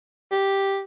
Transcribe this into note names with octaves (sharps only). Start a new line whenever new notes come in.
G4